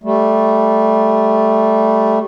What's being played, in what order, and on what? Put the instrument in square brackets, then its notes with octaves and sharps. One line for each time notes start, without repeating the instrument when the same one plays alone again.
[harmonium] G3 A3